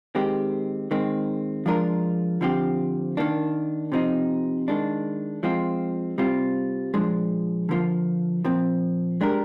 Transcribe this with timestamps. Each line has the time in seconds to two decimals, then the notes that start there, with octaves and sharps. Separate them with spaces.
0.15 D#3 G#3 C4 G4
0.91 D#3 G#3 C4
1.66 F3 G#3 D4 F4 A#4
2.41 D3 F3 C4 G4
3.17 D#3 A#3 D4
3.92 C3 F3 C4 D#4
4.68 D#3 G#3 D4
5.43 F3 G#3 C4 F4
6.18 C3 G3 C4 F4
6.94 A#2 F3 G#3 D4
7.69 D3 F3 A#3 F4
8.45 A#2 F3 C4
9.21 G#3 D4 G4 A#4